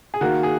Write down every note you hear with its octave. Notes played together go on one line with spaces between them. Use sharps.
G#4
D#3 A#3 F#4
G#4